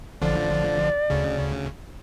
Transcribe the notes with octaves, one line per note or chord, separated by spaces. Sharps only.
A1 D3 F3 D5
D2 C#3